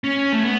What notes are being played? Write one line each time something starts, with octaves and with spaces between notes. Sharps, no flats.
C#4
A3
B3